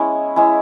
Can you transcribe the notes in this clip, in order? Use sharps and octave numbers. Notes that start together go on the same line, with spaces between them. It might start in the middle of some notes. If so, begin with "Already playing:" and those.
Already playing: G#3 B3 C#4 E4
G#3 C#4 E4